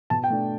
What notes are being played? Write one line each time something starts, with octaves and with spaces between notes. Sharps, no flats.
B2 A5
G5
A3 D4